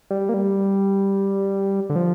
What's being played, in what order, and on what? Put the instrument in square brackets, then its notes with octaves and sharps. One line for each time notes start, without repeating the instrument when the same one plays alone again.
[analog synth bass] G3
A#3
G3
D3
F3